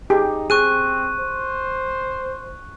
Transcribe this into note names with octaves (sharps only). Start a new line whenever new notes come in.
D#4 G4 G#4
C4 G#4 C#6 F#6 D#7
C5